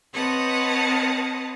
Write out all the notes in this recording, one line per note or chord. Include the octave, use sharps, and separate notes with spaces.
C4 B4 C#5 D#5 F#5 A5